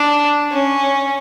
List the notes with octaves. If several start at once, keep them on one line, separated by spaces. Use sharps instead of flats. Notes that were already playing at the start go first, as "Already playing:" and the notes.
Already playing: D4
C#4